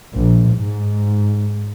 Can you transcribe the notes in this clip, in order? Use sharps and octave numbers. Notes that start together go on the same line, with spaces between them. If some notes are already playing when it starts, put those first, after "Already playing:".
A#1
G#2